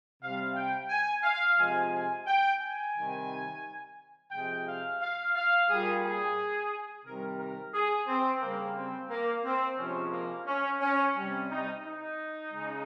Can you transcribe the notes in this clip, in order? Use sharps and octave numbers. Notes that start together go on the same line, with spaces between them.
C3 G3 F5
G5
G#5
F5
C3 F3 G#3 G#5
G#5
G5
G#5
C3 D#3 G3
C3 F3 G#3 G5
F5
F5
F5
A#2 G3 G#4
G#4
C3 D#3 G3 A#4
A#4
G#4
C4
C#3 G3 A#3
C4
A#3
C4
C3 F3 G#3 C#4
A#3
C#4
C#4
C3 G3 C#4
D#4
D#4
C#3 G#3